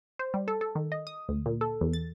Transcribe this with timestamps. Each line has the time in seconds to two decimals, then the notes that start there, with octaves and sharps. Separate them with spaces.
0.19 C5
0.34 G3
0.48 A4
0.61 A4
0.75 D#3
0.92 D#5
1.07 D#6
1.29 D2
1.46 A#2
1.61 A4
1.81 E2
1.93 A6